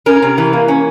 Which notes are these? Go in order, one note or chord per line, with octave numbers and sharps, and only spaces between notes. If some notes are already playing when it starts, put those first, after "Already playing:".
C#4 A#4
C3
E3
A#3
C#4